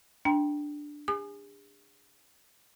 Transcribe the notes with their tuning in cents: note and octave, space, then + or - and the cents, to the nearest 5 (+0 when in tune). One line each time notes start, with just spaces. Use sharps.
D4 +5 G5 +0 A#5 +35
G#4 -45 G#5 +5 D#6 -40